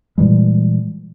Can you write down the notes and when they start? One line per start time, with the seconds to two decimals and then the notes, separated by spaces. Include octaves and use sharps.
0.18 A#2 E3 G3 G#3